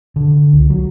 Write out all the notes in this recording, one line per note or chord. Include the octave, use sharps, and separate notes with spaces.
D3
C#2
F#3